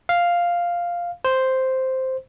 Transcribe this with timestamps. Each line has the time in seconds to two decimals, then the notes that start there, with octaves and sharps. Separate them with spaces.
0.09 F5
1.25 C5